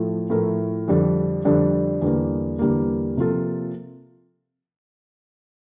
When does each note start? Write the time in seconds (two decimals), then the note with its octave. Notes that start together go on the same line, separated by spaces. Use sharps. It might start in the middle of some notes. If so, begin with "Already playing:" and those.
Already playing: A2 F3 A3 E4
0.30 A2 F3 A3 E4 A#4
0.88 F2 D3 G3 D4 A4
1.45 F2 D3 G3 D4 A4
2.02 E2 D3 G3 A#3
2.59 E2 D3 G3 A#3
3.17 C3 F3 A#3 F4 A4